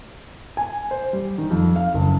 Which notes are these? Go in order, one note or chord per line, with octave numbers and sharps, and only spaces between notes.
G#5
C5
G3
D#3
F2
F5
F#1